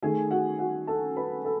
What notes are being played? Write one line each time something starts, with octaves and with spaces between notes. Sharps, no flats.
D#3 A3 G#4 G#5
F#4 F#5
F#4 F#5
A4 A5
B4 B5
A4